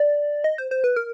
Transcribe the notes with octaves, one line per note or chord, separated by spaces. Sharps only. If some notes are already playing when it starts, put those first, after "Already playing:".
Already playing: D5
D#5
C5
C5
B4
A#4